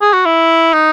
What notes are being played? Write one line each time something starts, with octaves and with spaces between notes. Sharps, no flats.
G#4
F#4
E4
D#4